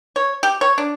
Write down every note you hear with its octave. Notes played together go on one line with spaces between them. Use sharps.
C#5
G4
C#5
D4